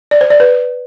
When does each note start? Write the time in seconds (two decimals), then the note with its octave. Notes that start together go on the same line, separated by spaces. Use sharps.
0.11 D5
0.21 C5
0.30 D5
0.40 B4